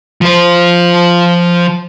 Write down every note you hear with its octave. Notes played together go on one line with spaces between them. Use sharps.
F3 C5